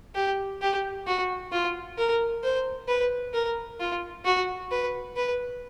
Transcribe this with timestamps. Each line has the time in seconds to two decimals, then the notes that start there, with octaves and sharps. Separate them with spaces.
0.15 G4
0.61 G4
1.06 F#4
1.52 F4
1.98 A#4
2.43 C5
2.88 B4
3.34 A#4
3.80 F4
4.25 F#4
4.71 B4
5.16 B4